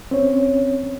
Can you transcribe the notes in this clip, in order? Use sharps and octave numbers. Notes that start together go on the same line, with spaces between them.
C4 C#4 C#5